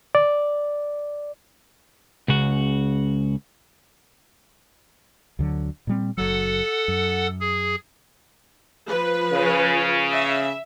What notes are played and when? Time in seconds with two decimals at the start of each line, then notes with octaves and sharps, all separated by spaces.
0.15 D5
2.28 C#2 C#3 F#4
5.39 D2 D3 F#3
5.87 A#2 G3 C4
6.17 F#1 F#3 A4 F#5
6.88 F#2
7.41 G#4
8.89 F3 B4
9.33 C#3
10.12 E5